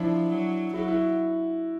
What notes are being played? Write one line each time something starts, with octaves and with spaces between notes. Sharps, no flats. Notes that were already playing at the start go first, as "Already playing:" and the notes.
Already playing: F3 D4 E4
F#3
F#3 E4 F#4
E4 F#4